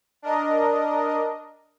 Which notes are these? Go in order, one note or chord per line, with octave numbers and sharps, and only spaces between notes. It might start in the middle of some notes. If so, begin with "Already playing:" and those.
D4 A#4 D#5